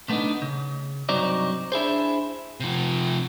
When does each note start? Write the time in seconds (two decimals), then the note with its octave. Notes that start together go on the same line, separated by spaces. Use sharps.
0.08 A#2 A3 B3 D4 D#4
0.42 C#3
1.09 C2 G2 F#3 C4 D#4 D5
1.72 D4 E4 G#4 C5
2.60 C3 F3